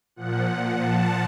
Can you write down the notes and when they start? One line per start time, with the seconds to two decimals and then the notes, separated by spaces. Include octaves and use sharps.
0.16 A#2 F3 F#5
0.78 A5